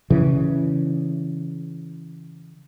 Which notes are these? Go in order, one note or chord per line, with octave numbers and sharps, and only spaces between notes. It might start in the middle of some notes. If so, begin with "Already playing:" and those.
C#3 E3